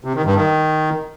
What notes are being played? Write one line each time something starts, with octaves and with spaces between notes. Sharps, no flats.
C3
D#3
G2
D#3